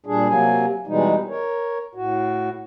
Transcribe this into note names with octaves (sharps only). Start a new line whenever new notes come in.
A#2 G3 D4 G#4
C3 F#3 A#3 G#5
B2 E3 G3 G#3 D#4
A#4 C#5
A2 F#4